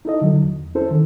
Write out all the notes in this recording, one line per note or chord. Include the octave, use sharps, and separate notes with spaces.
D#4 E4 A4 D#5
D3 F#3
E2
C#4 E4 A4 C5
D#3